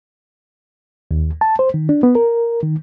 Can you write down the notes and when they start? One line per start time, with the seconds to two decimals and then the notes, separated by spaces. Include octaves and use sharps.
1.11 D#2
1.41 A5
1.59 C5
1.74 D#3
1.89 D4
2.03 B3
2.15 A#4
2.63 D#3